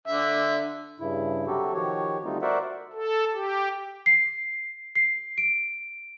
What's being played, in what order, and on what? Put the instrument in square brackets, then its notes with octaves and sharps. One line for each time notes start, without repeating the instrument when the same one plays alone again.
[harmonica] D3 E5
[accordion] G2 C#3 E4
C3 F#3 C4 F#4 G4 A4
D#3 F3 F#4 G4 C#5
D3 G3 A3 C4 D#4 F4
F#4 A#4 C5 D5 E5 F#5
[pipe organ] A4
G4
[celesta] C7
C7
D7